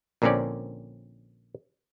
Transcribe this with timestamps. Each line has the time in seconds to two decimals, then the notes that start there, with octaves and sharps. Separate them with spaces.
0.22 A#1 A#2 D3 C4 C#4 D5